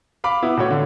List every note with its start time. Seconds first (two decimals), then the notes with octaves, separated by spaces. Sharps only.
0.24 F5 B5 D6
0.43 B3 E4
0.57 A2 F#4 C#5
0.71 D3